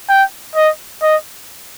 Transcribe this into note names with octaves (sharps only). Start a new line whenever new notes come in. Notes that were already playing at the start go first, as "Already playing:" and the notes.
G5
D#5
D#5